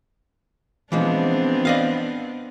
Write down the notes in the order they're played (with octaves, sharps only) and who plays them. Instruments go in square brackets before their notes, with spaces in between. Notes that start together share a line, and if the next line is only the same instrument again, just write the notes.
[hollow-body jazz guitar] E3 F3 G#3 [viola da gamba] B3 C4 D4
[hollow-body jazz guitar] D5 D#5 F5